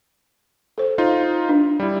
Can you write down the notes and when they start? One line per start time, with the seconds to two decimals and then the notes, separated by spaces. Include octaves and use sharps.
0.78 A4 C5
0.98 D#4 F4
1.49 D4
1.80 G3 E4